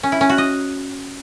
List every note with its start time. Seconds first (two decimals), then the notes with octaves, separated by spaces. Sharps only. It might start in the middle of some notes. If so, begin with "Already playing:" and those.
0.03 C#4
0.12 E4
0.21 C#4
0.29 F#4
0.38 D#5